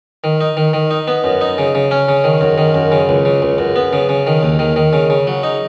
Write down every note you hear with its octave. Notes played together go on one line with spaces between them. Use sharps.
D#3
D#4
D#3
D#3
D#4
B3
F#2
D#4
C#3
C#3
C#4
C#3
D#3
F#2
D#3
F#2
C#3
C#2
C#3
C#2
F#2
B3
C#3
C#3
D#3
D#2
D#3
D#3
C#3
C#3
F#3
D#4